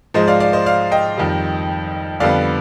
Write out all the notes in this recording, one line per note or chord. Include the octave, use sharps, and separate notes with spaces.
G#2 F3 G#3 C5 D#5
D5 F5
D5 F5
C5 D#5
D5 F5
D#5 G5
F2 D#3 G3
F2 D3 G3 B3 D5 F5